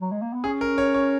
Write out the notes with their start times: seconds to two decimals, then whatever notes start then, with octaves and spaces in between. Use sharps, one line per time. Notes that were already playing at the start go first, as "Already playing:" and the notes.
0.01 F#3
0.12 G#3
0.22 A#3
0.33 B3
0.44 C#4 G#4
0.61 A#4
0.78 C#5
0.94 C#5